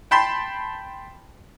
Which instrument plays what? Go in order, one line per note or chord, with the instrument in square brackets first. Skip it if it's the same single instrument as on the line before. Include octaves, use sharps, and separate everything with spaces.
[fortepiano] G5 A5 B5 C6